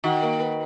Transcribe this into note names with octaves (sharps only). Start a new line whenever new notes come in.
D#3 F#4
A#3
B4